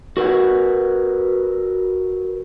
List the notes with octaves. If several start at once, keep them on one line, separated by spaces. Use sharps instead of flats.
F#4 A#4 B4 F#5